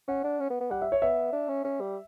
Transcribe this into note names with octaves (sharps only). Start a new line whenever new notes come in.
C#4 F#5
D4
C#4
B3
B3
G3 F#5
E5
C#5
B3 E5
D4
C#4
C#4
G3